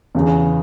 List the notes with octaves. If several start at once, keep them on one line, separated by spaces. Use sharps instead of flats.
E2 C#3 E3